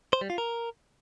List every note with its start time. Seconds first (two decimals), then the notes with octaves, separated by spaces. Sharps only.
0.13 C5
0.21 G3
0.30 F4
0.38 A#4